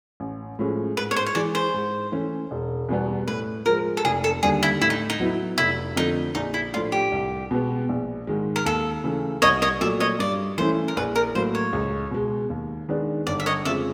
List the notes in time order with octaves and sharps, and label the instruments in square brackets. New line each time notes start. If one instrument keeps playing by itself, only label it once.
[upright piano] A1
A2 F3 G#3 C#4
[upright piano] G#2 [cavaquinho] B4
[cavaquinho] C#5
C5
C#5
[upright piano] E3 G#3 [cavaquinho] D5
[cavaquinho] C5
[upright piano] G#2
E3 A3 C#4
E1
E2 B2 G3 B3
[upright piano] A2 [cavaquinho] B4
[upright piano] F3 G#3 [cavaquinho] A#4
[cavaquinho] A4
[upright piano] F1 [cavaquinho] G#4
[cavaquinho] A4
[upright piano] D#2 D3 G3 [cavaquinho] G#4
[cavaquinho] E4
[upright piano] A2 [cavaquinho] E4
[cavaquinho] D#4
D#4
[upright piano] F#3 B3 E4
[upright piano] F1 [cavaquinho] E4
[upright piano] F2 D3 F3 A3 [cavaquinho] D#4
[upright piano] A#1 [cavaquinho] D#4
[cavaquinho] E4
[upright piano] A2 F3 A3 D4 [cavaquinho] F4
[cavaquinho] G4
[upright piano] C2
B2 G#3 B3
A#1
G#2 D#3 G#3
[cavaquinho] A#4
[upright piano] D#2 [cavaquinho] A4
[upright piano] C#3 E3 A3
[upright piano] C2 [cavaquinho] C#5 D#5
[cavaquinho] C#5 D#5
[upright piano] A#2 F#3 A3 [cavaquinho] D5 E5
[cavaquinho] C#5 D#5
[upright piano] G2 [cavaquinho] D5
[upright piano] E3 A3 C#4 E4 [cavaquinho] C5
[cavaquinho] A#4
[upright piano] A#1 [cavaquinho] B4
[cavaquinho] A#4
[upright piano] A2 F#3 A#3 [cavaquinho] C5
[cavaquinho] C#5
[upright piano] C#2
B2 G#3
D#2
D#3 G#3 B3 D4
[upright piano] G1 [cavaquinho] D5
[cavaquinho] E5
C#5 D#5
[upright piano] F2 C#3 F3 G#3 [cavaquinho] D5 E5